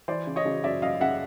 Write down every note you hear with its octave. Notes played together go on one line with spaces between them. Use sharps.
E3 C5 D5
C#3
C#5 D#5
C#3
F#2 D5 E5
F#2 D#5 F5
C#3 E5 F#5